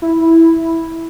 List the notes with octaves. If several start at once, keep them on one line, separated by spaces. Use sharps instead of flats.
E4